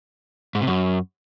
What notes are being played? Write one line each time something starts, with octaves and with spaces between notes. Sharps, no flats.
G#2
C3
F#2